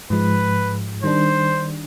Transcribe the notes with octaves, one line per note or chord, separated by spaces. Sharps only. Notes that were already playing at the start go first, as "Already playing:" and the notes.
G#2 F3 G#3 B4
D#3 G3 D4 C5